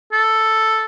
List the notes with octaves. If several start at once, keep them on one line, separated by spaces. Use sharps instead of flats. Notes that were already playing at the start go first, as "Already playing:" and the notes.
A4